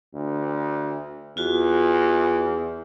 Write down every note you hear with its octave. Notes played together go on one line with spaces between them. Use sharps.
D2
E2 F4 F#4